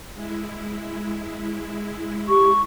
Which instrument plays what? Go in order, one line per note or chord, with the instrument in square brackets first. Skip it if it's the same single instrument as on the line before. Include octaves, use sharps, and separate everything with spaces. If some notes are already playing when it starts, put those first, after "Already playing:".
[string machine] G#3 E4
[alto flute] G4 [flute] C#6